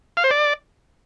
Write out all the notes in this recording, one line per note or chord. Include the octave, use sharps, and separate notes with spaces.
F5
C5
D5